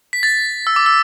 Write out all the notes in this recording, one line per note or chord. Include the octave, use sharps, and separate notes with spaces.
B6
A6
E6
D6
E6